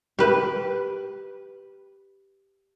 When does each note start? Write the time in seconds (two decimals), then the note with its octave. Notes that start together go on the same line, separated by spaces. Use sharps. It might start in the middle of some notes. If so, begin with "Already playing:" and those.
0.19 G4 B4